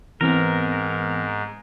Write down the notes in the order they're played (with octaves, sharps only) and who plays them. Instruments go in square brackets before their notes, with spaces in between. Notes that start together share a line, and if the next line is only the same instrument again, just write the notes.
[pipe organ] G#2 [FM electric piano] E3 B3 C4 [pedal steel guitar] A#4